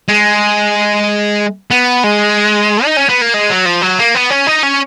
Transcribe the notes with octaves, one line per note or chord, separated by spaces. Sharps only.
G#3
B3
G#3
D#4
C#4
B3
A#3
G#3
F#3
F3
F#3
A#3
B3
C#4
D#4
C#4